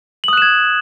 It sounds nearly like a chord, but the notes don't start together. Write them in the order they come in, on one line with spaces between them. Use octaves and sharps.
F#7 D#6 F#6 E7 G#6